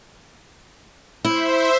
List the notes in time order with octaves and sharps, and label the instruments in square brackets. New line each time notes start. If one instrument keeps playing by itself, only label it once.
[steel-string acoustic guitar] E4 [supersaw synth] C5 E5